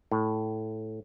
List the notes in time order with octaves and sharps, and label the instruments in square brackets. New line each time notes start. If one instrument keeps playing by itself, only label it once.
[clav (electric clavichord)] A2